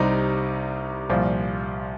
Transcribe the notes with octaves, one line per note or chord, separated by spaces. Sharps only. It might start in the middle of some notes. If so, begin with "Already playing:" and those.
Already playing: C2 C3 G3 C4 D#4
C2 A#2 F3